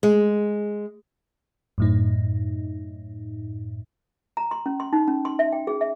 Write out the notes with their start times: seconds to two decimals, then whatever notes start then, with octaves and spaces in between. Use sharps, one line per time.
0.03 G#3
1.78 F#2 A2 D#4
4.37 A#5
4.51 C6
4.66 C#4
4.80 C6
4.93 D#4
5.08 C#4
5.25 C6
5.39 E5
5.52 G5
5.67 G#4
5.81 E5